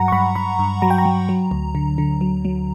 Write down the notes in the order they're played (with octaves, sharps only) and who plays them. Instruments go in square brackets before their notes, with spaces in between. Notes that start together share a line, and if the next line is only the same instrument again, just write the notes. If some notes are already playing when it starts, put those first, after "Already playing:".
Already playing: [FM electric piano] G2 F#3 F#5 A#5
C#6
G2 B5
G2 B5
G2
F#3 A#5
G5
A#5
F#3
F#3
D2
D3
D3
F#3
F#3